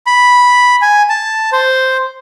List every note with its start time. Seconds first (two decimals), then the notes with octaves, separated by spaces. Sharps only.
0.06 B5
0.82 G#5
1.09 A5
1.52 C5